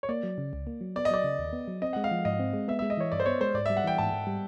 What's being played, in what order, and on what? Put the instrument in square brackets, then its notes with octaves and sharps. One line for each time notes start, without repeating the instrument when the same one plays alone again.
[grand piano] C#5
[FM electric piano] A#3 [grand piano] D5
[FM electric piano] F#3
C#3
C#2
A#3
F#3
[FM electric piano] B3 [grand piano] D5
[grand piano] D#5
[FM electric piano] F#3 [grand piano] D5
[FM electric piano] C#3
D#2
B3
F#3
[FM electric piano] C4 [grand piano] D#5
[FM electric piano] G#3 [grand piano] F#5
[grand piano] F5
[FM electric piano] F3
[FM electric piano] G#2 [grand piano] D#5
[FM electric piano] C4
G#3
[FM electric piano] B3 [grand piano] E5
[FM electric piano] G#3 [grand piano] E5
[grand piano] D#5
[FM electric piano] E3 [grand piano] C#5
[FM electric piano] G2 [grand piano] D5
[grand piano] C5
[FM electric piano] B3 [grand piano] C#5
[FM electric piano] G#3 [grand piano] C5
[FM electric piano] G#2 [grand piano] D5
[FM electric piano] G3 [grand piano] E5
[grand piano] F#5
[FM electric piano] E3 [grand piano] G5
[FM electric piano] G#2 [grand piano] A5
[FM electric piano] G#2
G3